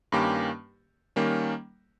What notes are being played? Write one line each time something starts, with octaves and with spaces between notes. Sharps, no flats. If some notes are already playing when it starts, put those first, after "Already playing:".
G2 D#3 A#3 C#4 G4
D#3 G3 A#3 C#4